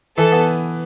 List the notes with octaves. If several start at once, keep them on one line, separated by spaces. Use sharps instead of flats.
E3 A4
B3